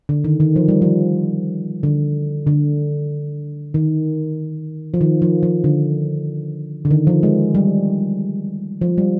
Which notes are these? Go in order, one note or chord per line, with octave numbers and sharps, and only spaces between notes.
D3
D#3
D#3
F3
G3
F3
D3
D3
D#3
F3
D#3
F3
F3
D3
D3
D#3
F3
G#3
G3
F3
G3